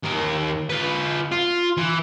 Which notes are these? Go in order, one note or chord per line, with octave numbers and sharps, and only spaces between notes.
D#2 A#4
F4 B4
F4
E3